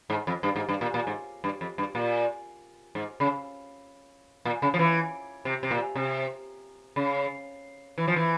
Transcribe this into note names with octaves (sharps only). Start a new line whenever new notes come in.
G#2
F2
G2
G#2
G2
A#2
A#2
G#2
G2
F2
G2
A#2
G#2
C#3
A#2
C#3
F3
E3
C3
C3
A#2
C3
C#3
E3
F3
E3